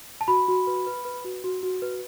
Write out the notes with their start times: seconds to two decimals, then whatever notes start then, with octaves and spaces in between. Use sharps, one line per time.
0.21 A5
0.28 F#4 B5
0.48 F#4
0.67 B4
0.87 B4
1.05 B4
1.25 F#4
1.44 F#4
1.63 F#4
1.82 B4